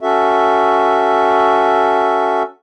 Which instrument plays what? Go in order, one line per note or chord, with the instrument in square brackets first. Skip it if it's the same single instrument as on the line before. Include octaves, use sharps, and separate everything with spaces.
[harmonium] C#4 F#4 A4 E5